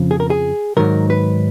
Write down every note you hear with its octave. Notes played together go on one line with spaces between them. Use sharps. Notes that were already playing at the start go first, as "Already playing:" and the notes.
Already playing: F2 C#3 F3
G#4
A#4
G#4
G#2 D#3 F#3 A#4
B4